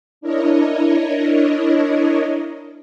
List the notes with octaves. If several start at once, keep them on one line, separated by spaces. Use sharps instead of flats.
D4 E4 A#4 C#5 D#5